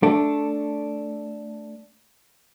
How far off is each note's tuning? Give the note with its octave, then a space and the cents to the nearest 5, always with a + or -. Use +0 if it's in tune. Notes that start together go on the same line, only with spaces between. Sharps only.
A3 +0 D4 -5